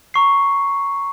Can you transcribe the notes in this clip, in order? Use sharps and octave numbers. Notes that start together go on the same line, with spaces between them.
A#5 C#6 C7